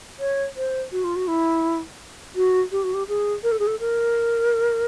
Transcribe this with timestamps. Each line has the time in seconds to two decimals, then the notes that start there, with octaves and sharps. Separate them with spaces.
0.19 C#5
0.56 C5
0.92 F#4
1.04 F4
1.16 F#4
1.28 E4
2.35 F#4
2.72 G4
2.84 F#4
2.94 G4
3.08 G#4
3.43 A#4
3.52 A4
3.59 G#4
3.67 A4
3.80 A#4